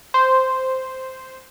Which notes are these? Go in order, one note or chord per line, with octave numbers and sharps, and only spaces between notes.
C5